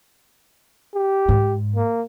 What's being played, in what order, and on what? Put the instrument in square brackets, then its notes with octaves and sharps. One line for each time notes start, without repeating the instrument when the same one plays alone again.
[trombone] G4
[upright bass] G#2
[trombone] A#3